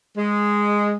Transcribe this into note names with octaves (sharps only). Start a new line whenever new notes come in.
G#3